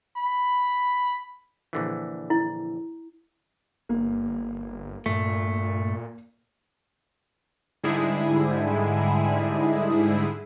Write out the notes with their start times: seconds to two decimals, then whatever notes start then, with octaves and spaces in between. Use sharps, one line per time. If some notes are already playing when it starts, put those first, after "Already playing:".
0.17 B5
1.73 A#1 D3 E3
2.30 E4
3.89 G1 A#3
5.06 G2 A#2 A3
7.83 G#2 D3 G3 G#3 E4 G#4